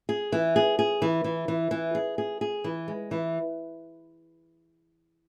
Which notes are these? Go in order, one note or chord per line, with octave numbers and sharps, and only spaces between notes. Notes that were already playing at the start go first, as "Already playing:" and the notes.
G#4
E3
G#4
G#4
E3
E3
E3
E3
G#4
G#4
G#4
E3
G#3
E3